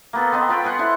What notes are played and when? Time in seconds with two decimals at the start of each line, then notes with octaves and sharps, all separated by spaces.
0.13 A#3 B3 A4
0.32 B3 C4 C5 D#5
0.49 F4 B4 G5 C#6
0.64 F#5 G#5 C6
0.79 E4 A4 C5